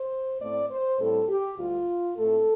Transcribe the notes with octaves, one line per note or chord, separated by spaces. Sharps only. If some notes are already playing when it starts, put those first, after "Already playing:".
Already playing: C5
A2 A3 C4 D5
C5
A2 G3 C4 A4
G4
D2 D3 G3 F4
A2 A3 C4 A4